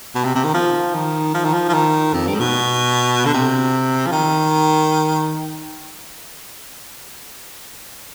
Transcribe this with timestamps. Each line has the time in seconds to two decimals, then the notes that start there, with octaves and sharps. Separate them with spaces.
0.15 B2
0.25 C3
0.35 C3
0.44 D#3
0.54 F3
0.95 D#3
1.35 F3
1.45 D#3
1.54 F3
1.69 F3
1.74 D#3
2.14 F2
2.27 G2
2.35 G#2
2.40 B2
3.26 D3
3.33 C3
4.07 F3
4.12 D#3